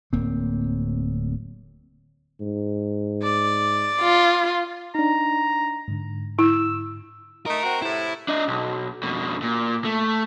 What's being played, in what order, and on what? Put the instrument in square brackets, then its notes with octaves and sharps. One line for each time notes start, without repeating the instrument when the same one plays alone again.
[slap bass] D1 A#3 C4
[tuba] G#2
[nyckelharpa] D5
[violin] F4
[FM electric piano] D4 D#4 [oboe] A#5
[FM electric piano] G#2 D3
[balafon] E4 [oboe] E6
[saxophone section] A3 D#4 [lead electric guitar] A#4
[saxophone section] C4 F#4
[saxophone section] A2 C3 [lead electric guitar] E4
[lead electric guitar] D4 D#5
B1
F2 B2
A#2
A3